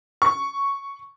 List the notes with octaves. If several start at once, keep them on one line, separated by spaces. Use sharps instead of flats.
C#6